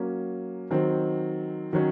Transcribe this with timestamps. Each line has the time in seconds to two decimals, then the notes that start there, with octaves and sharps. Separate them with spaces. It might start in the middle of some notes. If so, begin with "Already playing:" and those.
Already playing: F#3 A#3 C#4
0.71 D#3 F#3 C4
1.73 D#3 F#3 C#4